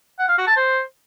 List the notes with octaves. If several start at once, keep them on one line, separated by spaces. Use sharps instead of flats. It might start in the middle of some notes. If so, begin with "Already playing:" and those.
F#5
F5
F#4
A5
C5